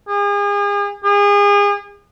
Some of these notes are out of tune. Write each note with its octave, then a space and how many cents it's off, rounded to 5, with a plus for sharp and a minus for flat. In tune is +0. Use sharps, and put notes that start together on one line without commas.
G#4 -40
G#4 -35